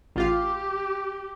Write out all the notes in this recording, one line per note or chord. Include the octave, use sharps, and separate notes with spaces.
A1 F4 G4 F5